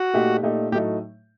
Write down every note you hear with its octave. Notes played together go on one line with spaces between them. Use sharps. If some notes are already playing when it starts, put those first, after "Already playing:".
Already playing: F#4
A#2 A3 D#4 G4
A#2 A3 D#4 G4
A2 F#3 A3 D#4 G4